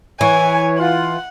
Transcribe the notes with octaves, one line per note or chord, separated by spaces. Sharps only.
E3 C#5 G#5
F4 F#5